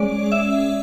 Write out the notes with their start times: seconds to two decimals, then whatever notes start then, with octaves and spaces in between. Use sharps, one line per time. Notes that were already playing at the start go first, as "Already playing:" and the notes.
Already playing: G#3 C#4 D5
0.32 E5